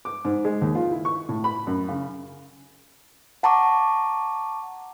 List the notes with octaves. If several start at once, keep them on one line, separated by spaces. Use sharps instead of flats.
D6
G#2
G#3
D#2
F4
E4
C#6
A2
B5
F#2
C#3
F#5 A5 A#5 C#6 D6